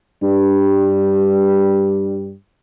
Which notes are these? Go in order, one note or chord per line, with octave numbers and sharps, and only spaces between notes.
G2 G3